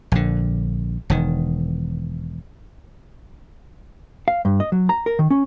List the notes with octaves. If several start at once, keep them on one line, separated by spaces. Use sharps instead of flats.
A#1 D3
E1 D#3
F5
G2
D#5
F#3
A#5
A#4
D#3
C#4